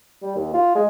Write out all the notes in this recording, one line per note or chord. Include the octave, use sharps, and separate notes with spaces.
G3
D#2
F4
G#3